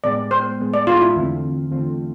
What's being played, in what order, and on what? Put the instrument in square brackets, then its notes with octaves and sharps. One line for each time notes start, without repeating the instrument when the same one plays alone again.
[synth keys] A2 G#3 B3 [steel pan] D5
[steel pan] C5
[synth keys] A2 G#3 B3
[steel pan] D5
F4
E4
[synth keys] E2 D3 A3 C4 F4
E2 D3 A3 C4 F4